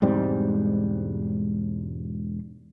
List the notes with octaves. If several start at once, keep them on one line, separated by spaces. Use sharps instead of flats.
E1 G#2 G3 C4